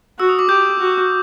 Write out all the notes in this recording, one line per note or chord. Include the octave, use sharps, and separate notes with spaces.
F#4 E6
D#6
D6
G4 G6
F#4